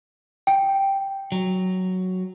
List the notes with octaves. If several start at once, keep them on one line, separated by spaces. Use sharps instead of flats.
G5
F#3